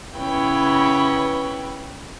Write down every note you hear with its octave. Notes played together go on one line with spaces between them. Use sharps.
C#3 B3 E4 B4 C#5 G5